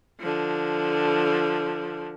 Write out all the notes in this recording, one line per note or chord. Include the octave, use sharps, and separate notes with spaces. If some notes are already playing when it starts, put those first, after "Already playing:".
D3 F3